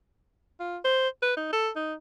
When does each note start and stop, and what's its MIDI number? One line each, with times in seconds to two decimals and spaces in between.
0.60 0.77 65
0.85 1.08 72
1.22 1.33 71
1.37 1.52 63
1.52 1.70 69
1.76 1.94 63